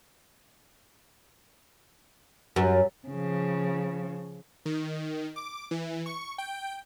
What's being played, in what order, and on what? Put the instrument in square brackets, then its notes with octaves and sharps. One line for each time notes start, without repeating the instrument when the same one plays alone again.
[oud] F#2
[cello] C#3 F3
[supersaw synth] D#3
D6
E3
C#6
G5